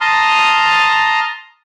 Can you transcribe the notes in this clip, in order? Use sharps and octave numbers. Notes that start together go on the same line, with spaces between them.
A5 A#5 C6 D#6 F6